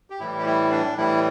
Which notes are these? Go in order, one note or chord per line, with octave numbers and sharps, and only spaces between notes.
G4
A2 E3 G3 E4
G4
E4
D4
A2 E3 G3 E4